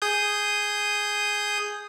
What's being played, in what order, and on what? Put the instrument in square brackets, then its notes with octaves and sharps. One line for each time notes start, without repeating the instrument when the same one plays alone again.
[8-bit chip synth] G#4 D#6 G6